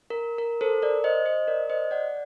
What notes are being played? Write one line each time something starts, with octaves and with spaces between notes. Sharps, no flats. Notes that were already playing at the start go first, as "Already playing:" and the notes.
A#4
A#4
A4 C5
A#4 D5
C5 D#5
C5 D#5
A#4 D5
C5 D#5
D5 F#5